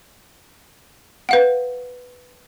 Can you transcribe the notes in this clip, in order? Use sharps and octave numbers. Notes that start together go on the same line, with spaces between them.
B4 F5 F#5